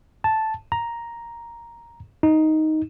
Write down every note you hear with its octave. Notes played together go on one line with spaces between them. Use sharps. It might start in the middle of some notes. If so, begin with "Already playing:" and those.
A5
A#5
D#4